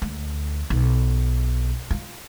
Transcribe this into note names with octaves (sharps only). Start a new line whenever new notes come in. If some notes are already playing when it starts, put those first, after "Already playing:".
D2
B1
F4